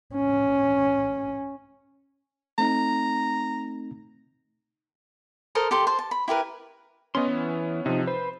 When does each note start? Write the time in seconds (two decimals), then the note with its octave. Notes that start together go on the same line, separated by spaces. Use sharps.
0.15 C#4
2.58 A3 C4 D#4 A#5
5.55 A4 A#4 C5 D#6
5.71 G4 A4 G5 C6
5.87 C5 A5
5.99 A5
6.11 B5
6.28 E4 G4 A#4 B4
7.15 B3 C#4 D#5 C6
7.27 E3
7.86 C3 F3 D#4
8.07 B4 C5